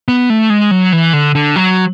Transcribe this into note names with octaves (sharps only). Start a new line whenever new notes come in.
B3
A3
G#3
F#3
E3
D3
D3
F#3